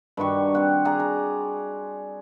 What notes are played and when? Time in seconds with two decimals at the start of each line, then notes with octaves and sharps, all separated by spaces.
0.17 G2 D#3 F#4 C#6
0.55 C4 F#5
0.85 G#4 D5 F#5 A#5
0.99 A#5